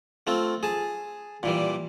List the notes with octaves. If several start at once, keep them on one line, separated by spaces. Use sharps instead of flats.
A3 C4 F4
G#4 A5
A#2 E3 G3